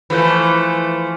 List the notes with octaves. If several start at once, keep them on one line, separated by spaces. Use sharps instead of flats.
E3 F3 A3